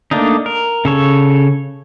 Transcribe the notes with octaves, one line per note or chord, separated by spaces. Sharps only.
A3 A#3 D4 D#4
A#4
C#3 A4 C#5